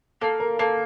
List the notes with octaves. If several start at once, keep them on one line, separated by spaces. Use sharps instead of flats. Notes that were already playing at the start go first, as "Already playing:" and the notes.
A#3 A4
A#4
A#3 A4